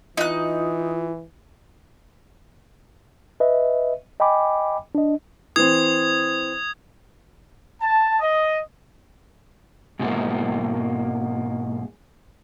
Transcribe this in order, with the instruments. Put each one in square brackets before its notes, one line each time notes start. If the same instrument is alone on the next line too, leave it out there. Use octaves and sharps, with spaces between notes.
[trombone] E3 [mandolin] D#4 F#6 [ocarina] F4
[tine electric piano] B4 D#5 E5
D#5 G5 G#5 B5 D6
D4 D#5
[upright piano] E3 C4 [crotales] D#6 G#6
[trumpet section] A5
D#5
[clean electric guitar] G#2 B2 D#3 G3 G#3 A#3